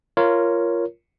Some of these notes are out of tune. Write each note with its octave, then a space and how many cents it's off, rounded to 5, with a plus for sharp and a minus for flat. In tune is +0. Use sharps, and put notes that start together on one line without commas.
F4 -15 A#4 +0 C#5 +0